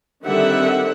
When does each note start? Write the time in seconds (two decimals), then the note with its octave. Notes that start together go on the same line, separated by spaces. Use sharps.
0.24 D3 D#3 G3 C4 E5 F#5